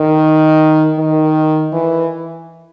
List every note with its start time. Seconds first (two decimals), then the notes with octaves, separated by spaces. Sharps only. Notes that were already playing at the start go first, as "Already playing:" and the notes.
Already playing: D#3
0.98 D#3
1.73 E3